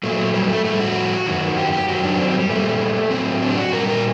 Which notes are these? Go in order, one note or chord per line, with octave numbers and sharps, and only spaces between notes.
A#2 F#3 A3
G3
A3
A2 G3 A3
F#4
F#2 D#3 F#3
G4
G4
F#2 D#3 F#3 F#4
D4
C4
G3
A#2 G3 A3
A2 F#3 C4
D4
G4
F#4
A#2 G3 A#4
A#4